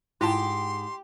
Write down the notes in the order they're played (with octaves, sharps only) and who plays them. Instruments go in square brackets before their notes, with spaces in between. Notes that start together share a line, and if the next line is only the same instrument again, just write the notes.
[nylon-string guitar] G#2 [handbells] E4 F4 A5 [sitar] G4 [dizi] C6